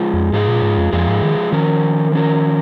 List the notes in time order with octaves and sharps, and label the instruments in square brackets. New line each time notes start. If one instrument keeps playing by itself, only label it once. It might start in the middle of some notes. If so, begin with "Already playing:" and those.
Already playing: [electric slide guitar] F3 G#3 F4 G#4
[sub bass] F2
[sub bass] G#2 [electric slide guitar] F3 G#3 F4 G#4
[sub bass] A#2
G#2
F2
[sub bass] F2 [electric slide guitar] F3 G#3 F4 G#4
[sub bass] G#2
D#3
[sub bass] D#3 [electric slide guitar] F3 C#4 A#4
[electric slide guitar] F3 C#4 A#4